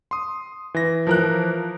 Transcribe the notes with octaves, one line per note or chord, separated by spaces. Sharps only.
C6 D#6
E3 A#6
F3 A#4 F#6